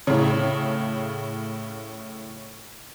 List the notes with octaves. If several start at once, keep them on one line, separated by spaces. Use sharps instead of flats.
A2 C#3